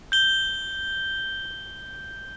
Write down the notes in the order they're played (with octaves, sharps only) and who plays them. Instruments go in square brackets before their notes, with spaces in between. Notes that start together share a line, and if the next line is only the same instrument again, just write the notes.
[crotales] G6 G7